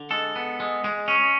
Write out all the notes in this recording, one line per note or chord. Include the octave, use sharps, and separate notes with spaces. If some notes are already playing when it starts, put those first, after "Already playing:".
Already playing: D3
G#3 A4
B3
G#3
G#3
C#4